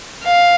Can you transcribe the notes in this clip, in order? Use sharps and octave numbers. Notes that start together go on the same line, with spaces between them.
F5